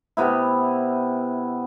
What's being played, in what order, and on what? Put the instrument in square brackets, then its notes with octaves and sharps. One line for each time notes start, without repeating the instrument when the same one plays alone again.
[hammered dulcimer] C3 B3 E4